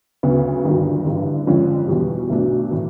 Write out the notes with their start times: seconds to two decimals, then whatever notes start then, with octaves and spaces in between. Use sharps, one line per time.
0.23 D2 C#3 F#3 B3
0.64 G1 G2 D#3 F#3
1.05 A1 G2 D3
1.47 F2 D3 F3 G#3 C#4
1.88 E2 B2 G3
2.30 B1 B2 F#3 A3 D4
2.71 A2 E3